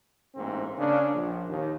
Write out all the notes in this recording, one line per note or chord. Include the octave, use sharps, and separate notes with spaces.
A1 G#2 A#3 C4
C#3 A#3 D4
A#1
D#2